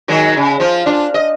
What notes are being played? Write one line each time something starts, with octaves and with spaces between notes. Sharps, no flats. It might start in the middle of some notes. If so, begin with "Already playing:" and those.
D#3 F#3 G#3
C#3
F3 F4
D4 F4
D#5